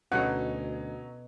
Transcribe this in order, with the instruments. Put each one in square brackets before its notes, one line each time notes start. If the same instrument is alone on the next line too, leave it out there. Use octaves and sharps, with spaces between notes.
[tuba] D2 [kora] B2 A4 [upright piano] F#3 C#4 D#4 [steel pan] F#5